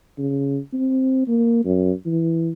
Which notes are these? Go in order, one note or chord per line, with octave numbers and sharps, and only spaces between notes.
C#3
C4
A#3
F#2
E3